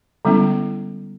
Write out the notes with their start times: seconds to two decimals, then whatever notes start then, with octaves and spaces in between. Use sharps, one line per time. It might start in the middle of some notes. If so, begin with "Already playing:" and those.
0.25 D3 G3 G#3 B3 C#4 E4